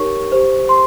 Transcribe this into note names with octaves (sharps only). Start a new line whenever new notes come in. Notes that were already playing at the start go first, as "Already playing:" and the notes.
Already playing: D#4 G4 A#4 C#5 C#6
G4 C5
C6